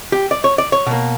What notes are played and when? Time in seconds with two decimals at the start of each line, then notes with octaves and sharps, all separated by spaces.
0.12 G4
0.31 D5
0.44 C#5
0.58 D5
0.72 C#5
0.86 B2 A#3